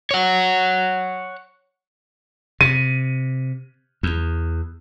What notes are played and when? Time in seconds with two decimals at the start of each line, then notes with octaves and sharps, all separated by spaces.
0.11 C#5 F#5
2.61 C3 D#7
4.03 E2